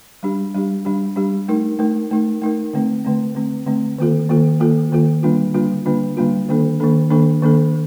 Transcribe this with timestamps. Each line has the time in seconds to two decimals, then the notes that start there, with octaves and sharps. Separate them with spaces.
0.23 G3 D4 G4
0.55 G3 D4 G4
0.85 G3 D4 G4
1.16 G3 D4 G4
1.48 A3 D#4 A#4
1.79 A3 D#4 A#4
2.11 A3 D#4 A#4
2.42 A3 D#4 A#4
2.74 D3 A3 C4
3.05 D3 A3 C4
3.35 D3 A3 C4
3.66 D3 A3 C4
3.98 D#3 A#3 F4 A4
4.29 D#3 A#3 F4 A4
4.60 D#3 A#3 F4 A4
4.92 D#3 A#3 F4 A4
5.23 D3 G3 A#3 D4 F4
5.54 D3 G3 A#3 D4 F4
5.86 D3 G3 A#3 D4 F4
6.17 D3 G3 A#3 D4 F4
6.49 D#3 A#3 D4 A4
6.80 D#3 A#3 D4 A4
7.10 D#3 A#3 D4 A4
7.42 D#3 A#3 D4 A4